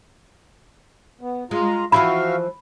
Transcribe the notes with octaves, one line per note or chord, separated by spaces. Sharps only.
B3
G#3 F4 A#5
E3 F3 E4 F#4 E5 F5 B5